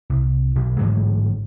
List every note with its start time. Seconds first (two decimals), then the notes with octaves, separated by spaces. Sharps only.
0.10 C2
0.55 B1
0.79 A1 G#2 D3 F#3